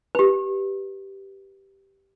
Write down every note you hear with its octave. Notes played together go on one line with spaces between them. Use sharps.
G4 B4